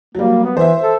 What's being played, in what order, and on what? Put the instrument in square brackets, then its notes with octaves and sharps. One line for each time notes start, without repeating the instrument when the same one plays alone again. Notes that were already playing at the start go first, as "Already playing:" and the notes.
[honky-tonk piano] F#3 G3 [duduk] A#3
[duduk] B3
[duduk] E3 [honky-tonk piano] C5 E5
[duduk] A4